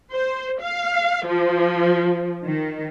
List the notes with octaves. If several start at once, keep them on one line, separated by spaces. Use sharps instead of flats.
C5
F5
F3
D#3